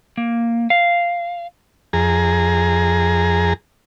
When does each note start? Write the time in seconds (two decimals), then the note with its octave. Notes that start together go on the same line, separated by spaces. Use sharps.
0.18 A#3
0.70 F5
1.93 F2 G#4 A#5